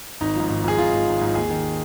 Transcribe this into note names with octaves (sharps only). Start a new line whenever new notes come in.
G#1 D#4
G#2 F3
G#1
G#2 F3 G#4
G#1 F4
G#2 F3
G#1
G#2 F3
D#2 G#4
D#3